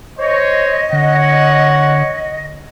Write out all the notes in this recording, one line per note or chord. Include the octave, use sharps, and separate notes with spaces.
C5 C#5 D#5
D3 C#5 F#5